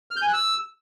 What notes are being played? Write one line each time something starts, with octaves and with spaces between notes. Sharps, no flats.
F6
G6
G#5
F#6
E6